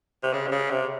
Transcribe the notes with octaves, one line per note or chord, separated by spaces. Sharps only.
C3
C#3
C3
C#3
C3